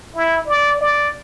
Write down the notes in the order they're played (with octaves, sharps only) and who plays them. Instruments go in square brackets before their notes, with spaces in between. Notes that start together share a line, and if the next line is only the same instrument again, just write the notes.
[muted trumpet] E4
D5
D5